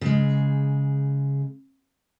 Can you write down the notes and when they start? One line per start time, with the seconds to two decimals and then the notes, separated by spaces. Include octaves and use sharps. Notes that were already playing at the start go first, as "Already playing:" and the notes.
0.01 C#3 G#3